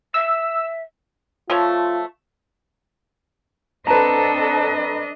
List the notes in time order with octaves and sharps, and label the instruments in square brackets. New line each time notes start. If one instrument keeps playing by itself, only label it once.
[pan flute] E5 [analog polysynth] E6
[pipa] F3 A3 C#5 [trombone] F4
[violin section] C4 A4 [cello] D4 D#5 [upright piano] B4 A#5 [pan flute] A5